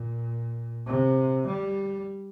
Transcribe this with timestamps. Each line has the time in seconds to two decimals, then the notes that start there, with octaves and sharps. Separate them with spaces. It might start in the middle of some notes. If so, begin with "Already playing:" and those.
Already playing: A#2
0.86 C3
1.46 G3